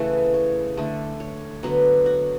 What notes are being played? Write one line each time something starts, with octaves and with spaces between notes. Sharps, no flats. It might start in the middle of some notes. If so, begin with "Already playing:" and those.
Already playing: C#3 E3 A3 B4 C#5
C#5
D3 A3
C#5
D3 F#3 B3 B4
F#4